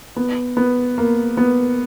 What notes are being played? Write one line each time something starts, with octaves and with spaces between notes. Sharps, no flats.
B3
B3
A#3
B3